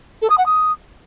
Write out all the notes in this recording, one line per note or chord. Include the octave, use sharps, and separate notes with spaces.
A4
D#6
F#5
D#6